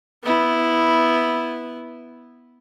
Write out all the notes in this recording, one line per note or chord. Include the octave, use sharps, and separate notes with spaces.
B3 E4